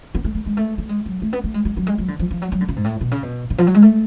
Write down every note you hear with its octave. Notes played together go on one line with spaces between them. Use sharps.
B3
A3
A3
G#3
A3
A3
G#3
F#3
A3
B3
A3
G#3
G#3
F#3
G#3
F#3
D3
F3
F3
F#3
F#3
D3
C#3
G#2
A2
B2
C#3
B2
C#3
F3
F#3
G#3
A3